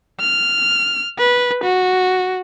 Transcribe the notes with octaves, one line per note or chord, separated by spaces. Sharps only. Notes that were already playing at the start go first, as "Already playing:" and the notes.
F6
B4
F#4